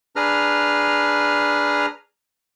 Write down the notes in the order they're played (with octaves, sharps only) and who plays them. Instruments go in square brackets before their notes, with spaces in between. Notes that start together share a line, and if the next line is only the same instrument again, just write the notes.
[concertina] D4 G#4 B4 A#5 F6